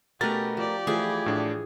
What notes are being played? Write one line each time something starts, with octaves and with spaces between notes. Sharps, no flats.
B2 A3 C#4 G4 A#4 B4 A6
F3 G4 D5
E3 F3 A3 G#4 B4
A2 D4